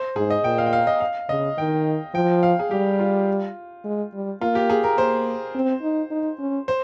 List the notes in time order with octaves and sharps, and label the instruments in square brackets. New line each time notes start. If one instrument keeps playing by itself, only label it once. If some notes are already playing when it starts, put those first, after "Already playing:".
Already playing: [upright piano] C5
[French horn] G#2 [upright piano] G#4
[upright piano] D#5
[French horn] A#2 [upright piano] G5
[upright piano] F5
G5
F5
D#5
F5
[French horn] C#3 [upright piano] D#5
[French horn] D#3 [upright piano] G5
[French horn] F3 [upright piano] G5
[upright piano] F5
G#4
[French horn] G3 [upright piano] G4
[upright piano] F4
[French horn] G#3
G3
[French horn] A#3 [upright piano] F4
[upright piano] G4
G#4
A#4
[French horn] A#3 [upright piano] C5
[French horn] C4
D#4
D#4
C#4
[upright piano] C5